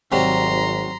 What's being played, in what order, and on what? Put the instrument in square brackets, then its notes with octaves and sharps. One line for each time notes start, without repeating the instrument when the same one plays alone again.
[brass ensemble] G#1 [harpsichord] C3 F#3 G3 [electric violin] A#5 C6